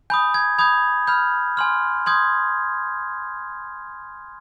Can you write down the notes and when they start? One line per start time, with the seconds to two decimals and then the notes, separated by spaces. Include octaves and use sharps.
0.10 G#5 B5 D#6 G6
0.34 G#6
0.58 B5 D#6 G6 G#6
1.07 B5 F6 G6
1.57 G#5 C6 F6
2.06 C6 D#6 G6 G#6